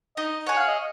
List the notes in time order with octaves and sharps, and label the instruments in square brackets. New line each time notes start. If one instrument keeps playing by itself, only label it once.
[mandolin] D#4 [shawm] D#5
[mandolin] G#4 C#5 [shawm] F#5
[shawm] F5
D#5